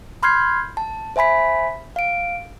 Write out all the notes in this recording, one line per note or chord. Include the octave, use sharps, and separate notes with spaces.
B5 C6 F6 G6 G#6 C7
A5
C5 E5 G#5 B5 B6
F5 D7